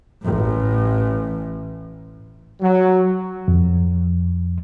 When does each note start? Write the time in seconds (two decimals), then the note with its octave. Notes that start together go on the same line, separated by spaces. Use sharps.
0.23 A1 A2
2.61 F#3
3.48 F2